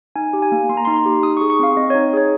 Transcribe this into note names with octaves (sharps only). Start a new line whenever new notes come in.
D#4 G#5
G4
G#5
A#3
A#3 C6
A#5
D#4 C6
C6
G4
D#4 D#6
C#6
G#4
C#6
C4 F5
C4 D#5
D#4 C#5
G#4 C#5